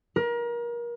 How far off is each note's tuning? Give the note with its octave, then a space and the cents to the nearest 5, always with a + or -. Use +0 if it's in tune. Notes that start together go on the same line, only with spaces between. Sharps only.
A#4 +30